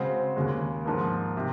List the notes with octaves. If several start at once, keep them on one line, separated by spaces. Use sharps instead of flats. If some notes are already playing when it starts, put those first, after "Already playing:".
Already playing: C#3 G#3 C4 F#4 C5
D#2 C#3 G#3
G#2 F3 A#3
C3